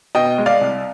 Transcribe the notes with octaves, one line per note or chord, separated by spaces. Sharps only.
B2 D#5 G5
G#3
D5 F5
C2